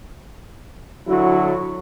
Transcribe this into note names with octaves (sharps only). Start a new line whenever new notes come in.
D3 F#3 E4 F#4